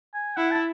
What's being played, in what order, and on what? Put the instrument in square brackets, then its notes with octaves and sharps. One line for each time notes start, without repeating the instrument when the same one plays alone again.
[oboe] G#5
[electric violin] E4 [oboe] F#5
[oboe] A5